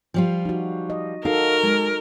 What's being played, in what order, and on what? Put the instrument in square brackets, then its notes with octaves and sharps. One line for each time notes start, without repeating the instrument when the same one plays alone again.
[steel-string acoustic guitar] F3 G3 F4
[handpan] D#4 F#4
D#5
[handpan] D#4 F#4 A4 [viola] A#4 [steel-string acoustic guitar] F5
[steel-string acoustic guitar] G#3